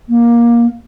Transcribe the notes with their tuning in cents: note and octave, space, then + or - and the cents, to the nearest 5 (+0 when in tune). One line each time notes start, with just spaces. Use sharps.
A#3 +15